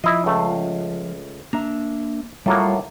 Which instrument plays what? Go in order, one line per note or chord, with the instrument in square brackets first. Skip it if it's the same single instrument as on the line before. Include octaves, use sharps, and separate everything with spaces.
[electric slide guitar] F3 [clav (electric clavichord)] E4 D#5
[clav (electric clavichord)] C#2 A3
[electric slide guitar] A#3 D4 E5 [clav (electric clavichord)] A#5
[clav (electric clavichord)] A2 F#3 A#3 [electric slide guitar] G3 F4 F#4